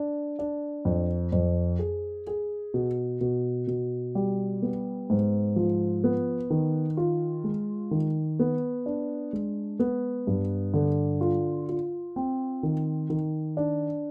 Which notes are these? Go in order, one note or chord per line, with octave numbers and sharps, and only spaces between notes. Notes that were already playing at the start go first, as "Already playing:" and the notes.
Already playing: D4
D4
F2
F2
G#4
G#4
B2
B2
B2
G3
B3
G#2
F3
B3
D#3
F4
G#3
D#3
B3
D4
G#3
B3
G2
D3
F4
F4
C4
D#3
D#3
D4